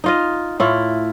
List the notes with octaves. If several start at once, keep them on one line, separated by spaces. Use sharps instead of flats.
D#4 F4 D#5
A2 E4 F4